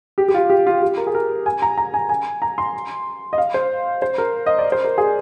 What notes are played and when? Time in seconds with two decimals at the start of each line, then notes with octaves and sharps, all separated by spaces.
0.18 G4
0.28 G4
0.34 F4
0.50 G4
0.67 F4
0.82 G4
0.97 A#4
1.07 G#4
1.15 A#4
1.46 G#5
1.62 A#5
1.78 A#5
1.94 G#5
2.09 G#5
2.42 A#5
2.58 C6
3.33 D#5
3.38 F5
3.54 C5
4.02 C5
4.18 A#4
4.46 D#5
4.59 D5
4.72 C5
4.84 A#4
4.98 G#4